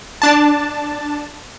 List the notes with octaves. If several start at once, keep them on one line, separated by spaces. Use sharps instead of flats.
D4 A5